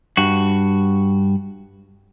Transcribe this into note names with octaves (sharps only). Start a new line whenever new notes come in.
G2 F#4